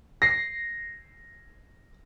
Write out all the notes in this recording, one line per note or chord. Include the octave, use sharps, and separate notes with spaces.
A#6 C7